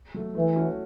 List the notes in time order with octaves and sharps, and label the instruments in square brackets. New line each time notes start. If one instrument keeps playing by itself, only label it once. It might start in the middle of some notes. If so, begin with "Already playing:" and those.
[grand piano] F#3 A3
[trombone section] E3 [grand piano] A3
[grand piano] C#4 F#4 A4